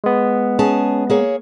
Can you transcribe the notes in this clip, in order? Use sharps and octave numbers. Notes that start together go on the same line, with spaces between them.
G#3 B3
C#4 G#4 A5
A#3 G#4 C#5